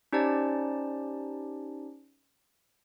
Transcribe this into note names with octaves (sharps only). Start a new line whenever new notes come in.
C#4 D#4 G4 C5 D5 A5